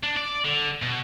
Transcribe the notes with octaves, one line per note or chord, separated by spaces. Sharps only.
D4
D5
D3
B2